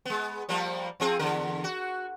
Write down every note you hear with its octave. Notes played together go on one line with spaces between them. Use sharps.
G#3 B3
F3 G3 A#3
F3 C4 G#4
E2 D3 A#4
F#4